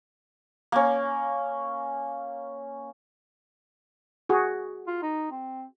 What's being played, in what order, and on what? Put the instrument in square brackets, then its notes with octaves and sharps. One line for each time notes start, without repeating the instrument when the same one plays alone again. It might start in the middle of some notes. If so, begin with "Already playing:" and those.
[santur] A#3 C#4
[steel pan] F#4 G#4
[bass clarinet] F4
D#4
C4